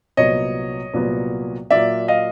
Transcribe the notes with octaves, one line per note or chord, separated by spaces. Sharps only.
C2 A#2 F#3 B3 C#5 D#5
C2 A#2 F#3 B3
A#2 F#3 A#3 D5 E5
D#5 F5